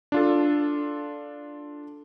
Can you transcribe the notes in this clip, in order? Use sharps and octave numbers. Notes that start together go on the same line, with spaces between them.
D4 F4 A4